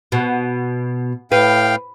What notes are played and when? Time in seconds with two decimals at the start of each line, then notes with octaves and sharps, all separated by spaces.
0.12 B2
1.32 A2 B4 F5 G5